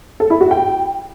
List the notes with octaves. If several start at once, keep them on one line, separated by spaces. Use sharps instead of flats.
A4
E4
F#4
G5